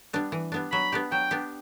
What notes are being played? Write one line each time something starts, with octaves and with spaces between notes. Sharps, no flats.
G3 B3 D4
E3
G3 B3 D4
F#3 B5
B3 D4 G4
F#3 G5
B3 D4 G4